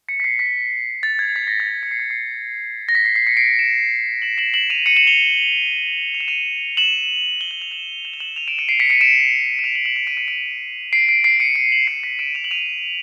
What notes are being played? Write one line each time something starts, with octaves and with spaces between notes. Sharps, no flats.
B6 C#7
B6
C7
B6
A6
G#6
B6
A#6
A6
A#6
C#7
C7
B6
C7
A#6
B6
C7
C7
B6 C#7
C7 D7
D7 E7
E7 F#7
E7 F#7
E7 F#7
D#7 F7
C#7 D#7
E7 F#7
F7 G7
F7
E7
D#7 F7
E7 F#7
G7
F#7
F7
E7 F#7
E7 F#7
G7
E7 F#7
D#7 F7
D7 E7
C#7 D#7
C7 D7
B6 C#7
C#7 D#7
D7 E7
E7
D#7 F7
E7 F#7
E7 F#7
D#7 F7
C#7 D#7
C7 D7
C#7 D#7
C7 D7
C7 D7
C7 D7
C#7 D#7
C#7 D#7
E7 F#7
C7 D7
B6 C#7
D7 E7
D#7 F7
F#7
D#7 F7